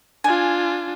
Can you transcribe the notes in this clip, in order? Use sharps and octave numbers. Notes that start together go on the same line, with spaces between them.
D4 F4 G#5